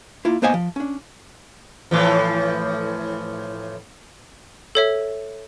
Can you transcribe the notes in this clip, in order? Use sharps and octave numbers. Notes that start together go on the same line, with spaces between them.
A#3 E4 F4
A#3 B3 C5 D#5 F5 G#5
F3
C#4 D4
A2 E3 F3
A4 C#5 E5